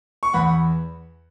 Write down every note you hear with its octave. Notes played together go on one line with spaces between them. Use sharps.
C#6
E2 F#5 B5